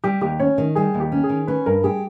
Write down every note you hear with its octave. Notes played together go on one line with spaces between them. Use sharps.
G3 G4
D#2 G4
C#4 C#5
D#3
G3 G#4
D#2
G4
C#4
G#4
D#3
C#4 B4
G2 A#4
G4 G#4